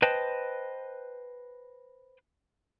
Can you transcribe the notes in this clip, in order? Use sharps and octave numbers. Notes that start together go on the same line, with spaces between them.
B4 C5 D#5 G5 A5